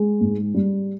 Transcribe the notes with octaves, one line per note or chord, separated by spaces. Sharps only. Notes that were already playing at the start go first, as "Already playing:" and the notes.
Already playing: G#3
G#2
G3